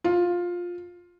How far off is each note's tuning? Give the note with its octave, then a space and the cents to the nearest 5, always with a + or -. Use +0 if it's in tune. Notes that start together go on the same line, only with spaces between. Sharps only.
F4 +10